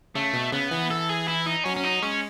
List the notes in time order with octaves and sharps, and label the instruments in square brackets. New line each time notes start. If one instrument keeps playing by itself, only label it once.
[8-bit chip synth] C#3 [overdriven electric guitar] A3
[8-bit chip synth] B2
[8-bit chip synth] C#3 [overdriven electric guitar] B3
[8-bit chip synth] E3
[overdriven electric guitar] A4
G#4
E4
D#4
[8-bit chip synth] F#3 [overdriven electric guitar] C#4
[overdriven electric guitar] C#4
D#4
[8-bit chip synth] G#3 [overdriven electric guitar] C#4